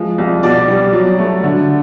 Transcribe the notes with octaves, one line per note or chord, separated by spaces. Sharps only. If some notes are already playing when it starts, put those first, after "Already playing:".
Already playing: F3 G#3
C2
B2 D5
G3
F#3
A3
D3